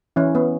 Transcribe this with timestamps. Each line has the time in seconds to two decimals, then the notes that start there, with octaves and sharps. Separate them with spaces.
0.16 E3 C#4 E4
0.35 B3